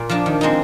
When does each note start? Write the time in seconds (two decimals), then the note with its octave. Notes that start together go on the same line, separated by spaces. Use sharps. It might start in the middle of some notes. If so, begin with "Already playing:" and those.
Already playing: A#2
0.09 F3 A#3 D4
0.26 D#3
0.41 G#3 C4 D#4